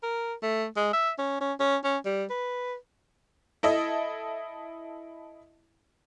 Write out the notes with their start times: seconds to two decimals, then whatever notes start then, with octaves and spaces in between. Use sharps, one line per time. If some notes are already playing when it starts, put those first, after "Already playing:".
0.03 A#4
0.43 A3
0.76 G#3
0.93 E5
1.18 C#4
1.41 C#4
1.60 C#4
1.84 C#4
2.05 G3
2.30 B4
3.63 E4 A4 D#5 E5